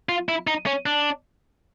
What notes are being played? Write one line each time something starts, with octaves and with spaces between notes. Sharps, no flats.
F4
E4
D#4
C#4
D4